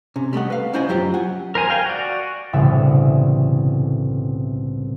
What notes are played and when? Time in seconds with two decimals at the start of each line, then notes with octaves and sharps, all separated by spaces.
0.16 C3 C#4
0.33 G3 A3 D#5 F#5
0.50 B4 F5
0.73 C#4 E4 C5 D5 D#5 G#5
0.89 F#2 F#3 F4 G4 C5 G5
1.14 F#5 G#5
1.55 A#4 C5 G#5 A#5
1.70 F5 G5 G#5
1.86 F#4 D5
2.53 E1 C2 A2 C#3 G3 E5